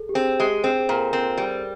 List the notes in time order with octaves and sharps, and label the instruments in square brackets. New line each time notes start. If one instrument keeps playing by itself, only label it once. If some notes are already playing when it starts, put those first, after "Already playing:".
Already playing: [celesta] G#4 A4
G4
[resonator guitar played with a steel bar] C4 [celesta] G#4
[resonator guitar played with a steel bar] G#3 [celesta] G4
[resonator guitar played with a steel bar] C4 [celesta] G#4
[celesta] G#4
[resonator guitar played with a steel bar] A#2 [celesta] A#4
[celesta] A4
[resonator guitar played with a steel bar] C4 [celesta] A#4
[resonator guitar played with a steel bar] G3